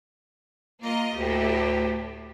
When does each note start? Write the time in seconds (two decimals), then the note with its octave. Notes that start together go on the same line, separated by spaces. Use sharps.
0.82 A#3 F4 A#4 D#5
1.15 D2 A2 G4